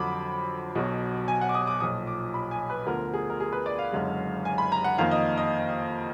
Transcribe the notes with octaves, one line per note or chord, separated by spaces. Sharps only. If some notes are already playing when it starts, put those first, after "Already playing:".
Already playing: F2 D3 F#3 B5 D6
B1 B2 F#3
G#5
F#5
D6
D#6
D6
B1 A#2 F3 D#6
D6
B5
G#5
B4
D2 D3 F3 B3 A#4
G#4
A#4
G#4
B4
D5
F5
F#1 F#2 D3 G#3
G#5
B5
A#5
F#5
F2 D#3 A#3 F5
D#5
D#5